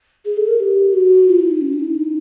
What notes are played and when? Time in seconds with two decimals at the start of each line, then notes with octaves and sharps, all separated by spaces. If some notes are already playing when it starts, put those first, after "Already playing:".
0.25 G#4
0.37 A4
0.48 A#4
0.60 G4
0.93 F#4
1.28 F4
1.39 E4
1.51 D#4
1.61 C#4
1.73 D4
1.80 D#4
1.84 E4
1.95 D#4